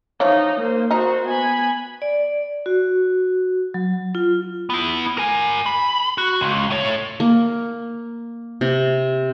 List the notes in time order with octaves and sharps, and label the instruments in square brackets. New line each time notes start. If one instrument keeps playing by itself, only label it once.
[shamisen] E3 F3 C#5 [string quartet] D#4
[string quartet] A#3 C5
[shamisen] D#4 [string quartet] F#4 C5
[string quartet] B3 G#5 B5
[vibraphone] D5
F#4
F#3
F4
[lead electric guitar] B3 E4
A#4 G#5
B5
F#4
C#2
A3 C#5
[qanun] A#3
C3